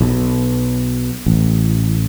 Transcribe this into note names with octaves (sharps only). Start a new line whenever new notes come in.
B1
A1